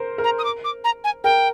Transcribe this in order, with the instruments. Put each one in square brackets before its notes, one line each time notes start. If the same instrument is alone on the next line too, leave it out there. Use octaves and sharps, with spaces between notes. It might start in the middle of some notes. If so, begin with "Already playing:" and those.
Already playing: [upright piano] A#4 C5
A#4
[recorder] A#5
D#6
D6
D6
A#5
G#5
[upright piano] A#4 [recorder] G5